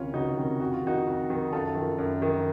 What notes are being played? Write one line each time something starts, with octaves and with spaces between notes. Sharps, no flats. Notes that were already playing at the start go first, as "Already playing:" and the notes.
Already playing: C#2 C3 D#3 C#4 F4
C#2 D#4 F#4
C3 D#3
F2 F#4
F4
D#3 D#4 F#4
F2
D#3
F#2 F4 A4
D#3
F#2
D#3